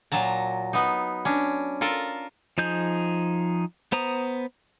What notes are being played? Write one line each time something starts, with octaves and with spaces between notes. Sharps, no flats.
A#2 F#3 A5 A#5
B3 D#4
C#4 D4
F4 A4 A#4
F3 D#4 G#4 G6
B3 C5 A#5 D#6